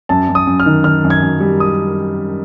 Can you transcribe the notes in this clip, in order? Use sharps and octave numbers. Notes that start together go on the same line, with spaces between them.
F#2 A5
F#2
D#6
F#2
F6
D#3
D#3 F6
F#2
G#6
F#2
G3
D#6